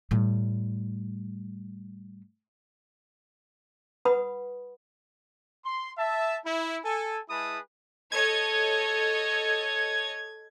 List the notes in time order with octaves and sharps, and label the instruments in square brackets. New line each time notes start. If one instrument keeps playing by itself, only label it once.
[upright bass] A2 G3
[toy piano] B4 F#5 B5 D#6
[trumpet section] C6
E5 A5
E4
A4 G#5
G#3 E4 G#4 B4 A5 D#6
[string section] A4 C#5 D#5 [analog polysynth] G#6